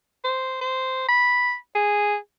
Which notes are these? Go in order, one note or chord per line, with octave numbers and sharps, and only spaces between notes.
C5
C5
B5
G#4